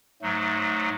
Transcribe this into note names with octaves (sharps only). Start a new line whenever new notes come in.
G#2 F#3 A3